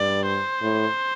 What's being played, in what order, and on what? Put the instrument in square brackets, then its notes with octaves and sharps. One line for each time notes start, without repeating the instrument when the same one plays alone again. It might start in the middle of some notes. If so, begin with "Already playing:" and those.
Already playing: [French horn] G2 [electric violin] D5
[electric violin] C5
[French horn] A2